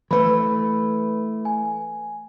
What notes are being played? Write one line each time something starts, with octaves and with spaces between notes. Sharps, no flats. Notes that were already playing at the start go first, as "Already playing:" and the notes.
E3 A3 B4 B5
G#5